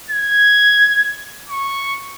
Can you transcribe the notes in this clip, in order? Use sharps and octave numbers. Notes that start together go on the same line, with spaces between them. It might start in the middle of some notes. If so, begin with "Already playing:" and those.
G#6
C#6